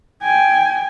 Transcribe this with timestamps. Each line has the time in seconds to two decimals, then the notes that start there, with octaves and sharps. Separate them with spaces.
0.22 G5 G#5